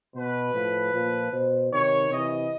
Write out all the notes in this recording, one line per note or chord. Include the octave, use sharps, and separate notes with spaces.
B2 B4
A2 F3
A#2 F3
B2 C5
C3 D#3 C#5
C3 E3 D#5